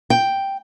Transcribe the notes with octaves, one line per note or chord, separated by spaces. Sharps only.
G5